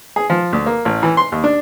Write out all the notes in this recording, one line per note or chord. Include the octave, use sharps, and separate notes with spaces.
G#4
F3
D2
A#3
A1
E3
C6
D#2
D4